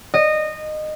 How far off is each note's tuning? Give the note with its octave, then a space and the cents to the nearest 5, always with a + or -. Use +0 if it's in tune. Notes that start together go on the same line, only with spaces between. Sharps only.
D#5 -20